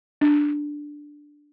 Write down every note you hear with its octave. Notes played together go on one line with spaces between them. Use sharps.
D4